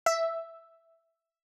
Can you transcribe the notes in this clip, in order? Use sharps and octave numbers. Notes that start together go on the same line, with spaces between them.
E5